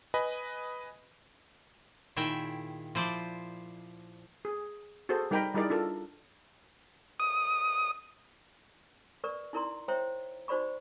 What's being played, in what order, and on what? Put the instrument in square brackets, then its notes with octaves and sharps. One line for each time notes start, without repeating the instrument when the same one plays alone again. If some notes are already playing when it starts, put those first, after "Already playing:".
[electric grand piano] B4 D#5 G#5 B5
[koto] A#2 D#3 E4 G#4 E5 G5
F3 E4 C5 D5
[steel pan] G#4
F#4 G#4 A4 C5
G3 D#4 A#4 G5 A#5 B5
G3 D#4 E4 G#4 A#4 D5
D4 F4 A4 A#4
[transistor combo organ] D#6
[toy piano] A#4 B4 D5 C#6
D#4 E4 A#4 D5 A#5 C6
C5 C#5 E5 G5 A#5
D#4 F#4 C5 D5 B5 C#6